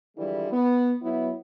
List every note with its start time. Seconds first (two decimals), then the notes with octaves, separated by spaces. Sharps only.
0.17 D3 E3 F3 G3 G#3 E4
0.52 B3
1.02 F#3 B3 E4